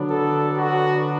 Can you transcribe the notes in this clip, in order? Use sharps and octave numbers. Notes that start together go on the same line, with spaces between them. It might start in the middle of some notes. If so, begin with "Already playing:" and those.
Already playing: D3 F#3 B3 D4
A4
F#4